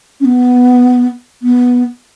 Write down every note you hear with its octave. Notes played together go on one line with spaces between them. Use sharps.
C#4
B3
B3